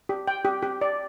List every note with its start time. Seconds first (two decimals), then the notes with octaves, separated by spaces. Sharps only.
0.09 G4
0.28 G5
0.45 G4
0.62 G4
0.81 D5